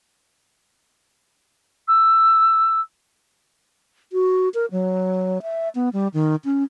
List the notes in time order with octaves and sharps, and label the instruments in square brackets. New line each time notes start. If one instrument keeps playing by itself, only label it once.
[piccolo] E6
[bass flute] F#4
A#4
F#3
E5
B3
G3
D#3
C#4